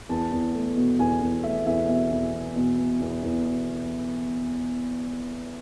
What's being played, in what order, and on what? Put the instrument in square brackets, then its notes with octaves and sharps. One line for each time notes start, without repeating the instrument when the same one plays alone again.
[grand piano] E2 A5
E2
A3
B2
E2 G#5
E2
A3 E5
E2 E5
B2 E5
E2
B2
B2
B2
E2
E2
B2